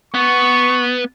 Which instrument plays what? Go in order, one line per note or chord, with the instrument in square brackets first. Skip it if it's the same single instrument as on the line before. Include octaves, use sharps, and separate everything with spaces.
[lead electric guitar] B3 [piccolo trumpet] C#6